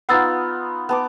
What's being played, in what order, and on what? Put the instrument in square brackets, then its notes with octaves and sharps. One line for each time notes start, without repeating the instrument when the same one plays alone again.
[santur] B3 D#4 F4 [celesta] F#5 E6 A6
[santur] B3 A5 D6